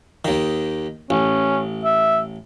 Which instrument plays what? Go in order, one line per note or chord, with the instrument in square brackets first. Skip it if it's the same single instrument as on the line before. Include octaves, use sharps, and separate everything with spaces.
[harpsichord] D#2 D#3
[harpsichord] A1 [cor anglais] C#4
[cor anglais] E5